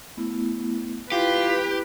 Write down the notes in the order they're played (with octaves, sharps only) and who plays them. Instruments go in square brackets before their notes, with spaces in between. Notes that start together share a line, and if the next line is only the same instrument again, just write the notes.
[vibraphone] A3 B3 E4
[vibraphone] E4 [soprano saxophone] F4 [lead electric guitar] G4 [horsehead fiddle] B4